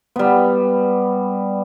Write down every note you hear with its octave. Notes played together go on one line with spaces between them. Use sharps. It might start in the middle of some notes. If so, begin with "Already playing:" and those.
G3 B3